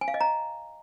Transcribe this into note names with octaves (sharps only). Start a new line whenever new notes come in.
G#5
F5
D#5
A#5